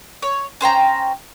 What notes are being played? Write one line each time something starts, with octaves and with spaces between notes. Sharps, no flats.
C#5
C#4 C5 G5 A#5